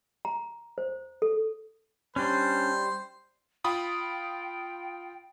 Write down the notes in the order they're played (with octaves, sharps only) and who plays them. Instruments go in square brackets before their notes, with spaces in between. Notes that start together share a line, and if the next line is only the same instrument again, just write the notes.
[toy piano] A#5
C5
A4
[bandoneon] G3 [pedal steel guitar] C#4 D4 [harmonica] C5
[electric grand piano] F4 B5 D#6 [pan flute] G5